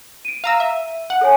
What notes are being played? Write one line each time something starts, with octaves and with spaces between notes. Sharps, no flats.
D7 D#7
F5 A#5 E6
E5
F#5
A4 C#5 G#5